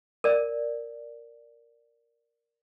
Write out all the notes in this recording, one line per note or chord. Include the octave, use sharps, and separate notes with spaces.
A#4 D5